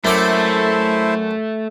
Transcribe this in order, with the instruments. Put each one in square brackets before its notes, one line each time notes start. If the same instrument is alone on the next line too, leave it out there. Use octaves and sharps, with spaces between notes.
[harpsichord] F#2 D5 D6 [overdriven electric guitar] A3 [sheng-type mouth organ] E4 C5